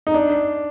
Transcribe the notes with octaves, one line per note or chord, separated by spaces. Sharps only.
D#4
D4